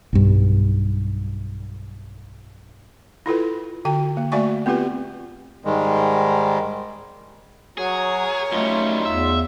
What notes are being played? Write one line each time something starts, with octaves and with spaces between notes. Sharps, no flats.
B1 G2
E4 F4 A4 B4
D3 F#4 G5
A#3
A3 F#4 D5 E5 G#5 C#6
B3 C4 F4 G4 B4
G#2 D#3 G3 G#3
F#3 F#4 G#4 A#4 C#5
F#2 G3 A3 D#4 F4
E2 E5